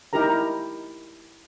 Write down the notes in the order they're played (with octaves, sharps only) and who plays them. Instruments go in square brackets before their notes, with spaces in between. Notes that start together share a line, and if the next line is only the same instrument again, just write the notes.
[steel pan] D#4 E4 G4 A#4 A#5